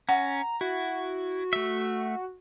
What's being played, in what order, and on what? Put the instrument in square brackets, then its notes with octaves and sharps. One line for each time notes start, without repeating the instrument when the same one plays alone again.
[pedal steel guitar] C#4 [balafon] F#5 [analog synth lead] A#5
[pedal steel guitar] E4 [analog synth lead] F#4
[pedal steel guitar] A3 E5